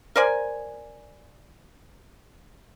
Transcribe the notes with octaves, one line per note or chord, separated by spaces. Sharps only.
A#4 C5 D5 G#5